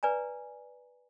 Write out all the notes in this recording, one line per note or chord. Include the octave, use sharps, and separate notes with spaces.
B4 D5 G#5 A#5